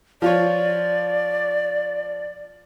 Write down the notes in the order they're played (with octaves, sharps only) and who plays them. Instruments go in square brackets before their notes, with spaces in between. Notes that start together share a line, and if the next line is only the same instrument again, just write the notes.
[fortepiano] F3 F4 C#5 [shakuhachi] D5